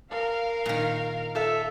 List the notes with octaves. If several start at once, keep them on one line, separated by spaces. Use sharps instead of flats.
A#4 F5
A#2 D#3
F4 A4 E5